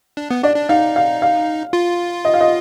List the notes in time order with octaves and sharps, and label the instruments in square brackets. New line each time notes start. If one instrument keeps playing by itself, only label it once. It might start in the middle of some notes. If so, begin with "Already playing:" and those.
[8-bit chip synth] D4
B3
[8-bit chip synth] D4 [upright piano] D5
[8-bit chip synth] D4
[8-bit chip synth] D#4 [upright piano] F5
[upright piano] F5
F5
[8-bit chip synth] F4
[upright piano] D#5
F5
D#5